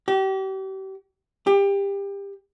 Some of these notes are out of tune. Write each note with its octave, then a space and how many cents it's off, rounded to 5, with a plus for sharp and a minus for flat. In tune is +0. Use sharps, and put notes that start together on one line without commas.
G4 -35
G4 +25